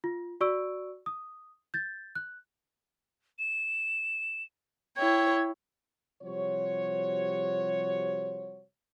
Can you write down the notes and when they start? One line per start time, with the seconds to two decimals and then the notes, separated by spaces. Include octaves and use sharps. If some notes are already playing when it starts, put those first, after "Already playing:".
0.04 F4
0.41 F#4 D5 C#6 E6 D7
1.06 D#6
1.74 G6 A6
2.15 F#6
3.39 E7
4.96 E4 C#5 G5 G#6
6.23 C3 F3 G3 F#4 C5 C#5